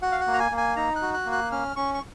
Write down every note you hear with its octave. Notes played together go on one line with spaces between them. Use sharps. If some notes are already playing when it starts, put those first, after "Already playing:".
F#4 F#5
F5
F#5
A#3
A#5
G#5
A#3
G#5
D#4 A#5
F#6
F#4
F#6
A#3
F#6
C#4 F6
C#4 C#6
C#6